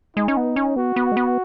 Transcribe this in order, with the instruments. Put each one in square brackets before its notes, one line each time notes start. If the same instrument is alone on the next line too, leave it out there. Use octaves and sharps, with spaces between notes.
[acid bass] G#3 [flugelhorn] D#4
[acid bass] C#4
B3
C#4
[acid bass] B3 [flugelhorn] F#4
[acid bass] B3
G#3
B3